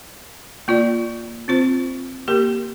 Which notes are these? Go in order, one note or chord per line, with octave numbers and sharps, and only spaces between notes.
A#3 F4 D5
C4 F4 C5
A#3 G4 A#4